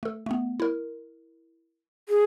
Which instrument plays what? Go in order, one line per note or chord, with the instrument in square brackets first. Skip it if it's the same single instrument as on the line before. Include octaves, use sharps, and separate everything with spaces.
[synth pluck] A3 A4
A3 B3
E4 A#4
[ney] G#4